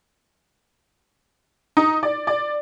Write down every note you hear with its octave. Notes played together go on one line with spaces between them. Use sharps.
D#4
D5
D5